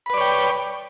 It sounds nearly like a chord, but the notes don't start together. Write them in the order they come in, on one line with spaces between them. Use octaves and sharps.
B5 B4 D5 C#5 G5